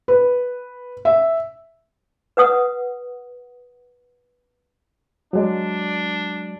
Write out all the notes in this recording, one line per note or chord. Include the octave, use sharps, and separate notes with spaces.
B4
E5
B4 F#5 D#6
F#3 G#3 D4